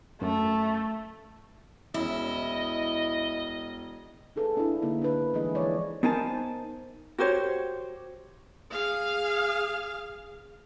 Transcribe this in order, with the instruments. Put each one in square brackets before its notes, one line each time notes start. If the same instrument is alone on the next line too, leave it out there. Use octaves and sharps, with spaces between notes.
[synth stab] F#2 [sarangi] A3
[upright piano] E1 C#4 E6 [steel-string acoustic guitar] E4 [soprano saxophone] D#5
[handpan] D#4 G#4 A4 B4
D4 E4
D3 A#3 D4 D#4
D4 B4
E3 G#3 E4 G#4 D#5
F3 C#5 D5
[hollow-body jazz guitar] B3 D#4 A#4 C5 G#5 A5
[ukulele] F#4 G4 C5 C#5
[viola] G#4 F5